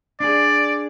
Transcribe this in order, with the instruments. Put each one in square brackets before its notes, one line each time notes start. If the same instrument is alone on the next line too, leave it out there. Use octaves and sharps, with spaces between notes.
[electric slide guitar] D4 G#4 [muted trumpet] D5